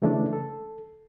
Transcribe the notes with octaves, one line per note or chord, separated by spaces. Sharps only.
C#3 E3 G#3 A3 C#4 D4
A4